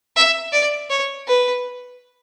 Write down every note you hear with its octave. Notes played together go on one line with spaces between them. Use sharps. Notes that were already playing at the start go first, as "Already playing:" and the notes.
E5
D5
C#5
B4